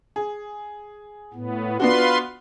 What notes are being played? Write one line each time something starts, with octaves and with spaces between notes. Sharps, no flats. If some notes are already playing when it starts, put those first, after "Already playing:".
G#4
A2 B3
B3 D4 F4 F#4 B4 C6